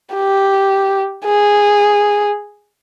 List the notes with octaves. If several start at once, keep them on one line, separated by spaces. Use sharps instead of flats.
G4
G#4